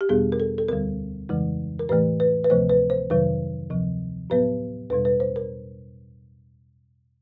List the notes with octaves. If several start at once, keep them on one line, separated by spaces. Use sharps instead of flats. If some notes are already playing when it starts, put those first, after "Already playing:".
G4
E2 B2 G3 B3 G#4
A#4
A4
A4
D2 D3 G3 A#4
F2 C#3 E3 G#3
A#4
A2 E3 A3 B4
B4
B4
D2 C3 F3 A3 C5
B4
C5
F2 C3 D#3 F#3 B4
D2 C3 F3
A2 F#3 B3 B4
E2 B2 G3 B4
B4
C5
A#4